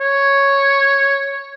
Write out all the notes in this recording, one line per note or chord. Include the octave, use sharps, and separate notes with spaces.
C#5